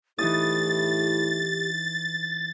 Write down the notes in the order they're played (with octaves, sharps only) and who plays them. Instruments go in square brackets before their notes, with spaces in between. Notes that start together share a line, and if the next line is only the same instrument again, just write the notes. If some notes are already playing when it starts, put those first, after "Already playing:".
[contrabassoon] A2 [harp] E3 D#4 D#6 [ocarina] G4 [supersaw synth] A6